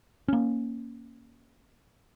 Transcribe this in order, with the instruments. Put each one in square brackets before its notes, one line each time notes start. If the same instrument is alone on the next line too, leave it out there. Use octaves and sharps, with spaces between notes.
[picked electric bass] A#3 C#4